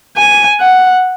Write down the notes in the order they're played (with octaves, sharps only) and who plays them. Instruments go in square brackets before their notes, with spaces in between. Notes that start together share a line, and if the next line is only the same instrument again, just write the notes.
[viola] G#5
F#5